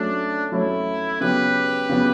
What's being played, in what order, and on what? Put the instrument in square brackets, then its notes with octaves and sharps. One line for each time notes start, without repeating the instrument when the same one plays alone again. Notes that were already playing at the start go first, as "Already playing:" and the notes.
Already playing: [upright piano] F#3 A3 C#4 [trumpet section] D4
[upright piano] F#3 A3 C#4 [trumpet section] E4
[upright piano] C#3 F#3 B3 [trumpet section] G4 B4
[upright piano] C#3 F#3 B3